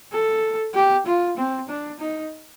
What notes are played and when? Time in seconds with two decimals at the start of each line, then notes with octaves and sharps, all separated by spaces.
0.12 A4
0.74 G4
1.06 F4
1.37 C4
1.69 D4
1.99 D#4